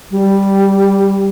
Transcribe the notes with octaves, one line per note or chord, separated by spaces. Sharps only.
G3